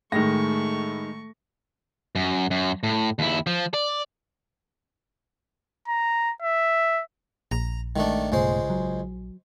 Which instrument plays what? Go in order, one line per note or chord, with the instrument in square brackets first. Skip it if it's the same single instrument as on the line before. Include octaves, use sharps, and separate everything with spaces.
[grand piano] A2 [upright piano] D#3 G#3 A#6 [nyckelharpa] A3 C#6
[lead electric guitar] F#2
F#2
A2
D#2 E4
F3
D5
[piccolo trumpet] A#5
E5
[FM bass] A#1 [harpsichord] A#5
[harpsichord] D#3 A3 D4 [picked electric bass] G#3
[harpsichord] C#2 G#3 C5 [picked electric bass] G2 B2 A3
[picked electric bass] F#3